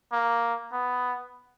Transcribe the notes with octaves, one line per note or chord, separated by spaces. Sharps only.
A#3
B3